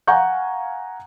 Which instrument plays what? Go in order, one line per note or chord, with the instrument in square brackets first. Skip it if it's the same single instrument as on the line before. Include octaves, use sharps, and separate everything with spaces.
[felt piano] F5 F#5 G#5 A#5 C#6 G6